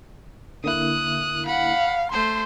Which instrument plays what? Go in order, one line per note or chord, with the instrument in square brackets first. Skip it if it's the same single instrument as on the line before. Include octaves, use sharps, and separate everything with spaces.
[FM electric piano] D3 A#3 E4 [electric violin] D#6 F#6
[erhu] F5 [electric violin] F#5 B5
[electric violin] A3 C5 [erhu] C6